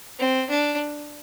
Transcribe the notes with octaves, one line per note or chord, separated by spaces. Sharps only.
C4
D4